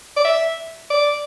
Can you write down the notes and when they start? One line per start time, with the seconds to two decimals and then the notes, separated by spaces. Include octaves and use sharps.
0.16 D5
0.25 E5
0.90 D5